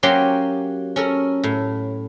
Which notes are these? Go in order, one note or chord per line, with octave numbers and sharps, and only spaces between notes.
F#3 A#3 C#4 G4 G5 C6
C#4 A4 A#4
A2